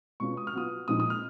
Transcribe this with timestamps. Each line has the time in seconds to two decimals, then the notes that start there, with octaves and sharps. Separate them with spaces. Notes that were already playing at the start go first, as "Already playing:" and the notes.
0.20 B2 G#3 C#4 F4 C#6
0.37 D#6
0.47 F6
0.54 F#3 B3 F4 D#6
0.88 A#2 F3 G#3 D#4 D#6
1.00 D#6
1.10 F6